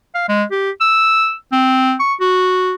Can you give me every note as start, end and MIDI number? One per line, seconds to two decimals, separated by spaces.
0.15 0.24 77
0.29 0.44 56
0.51 0.71 67
0.81 1.34 88
1.52 1.95 60
2.00 2.14 85
2.21 2.74 66